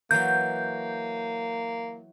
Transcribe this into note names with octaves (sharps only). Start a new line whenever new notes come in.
E3 F#3 A#3 G6